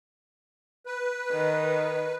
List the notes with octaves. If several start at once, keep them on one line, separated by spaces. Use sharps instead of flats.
B4
D#3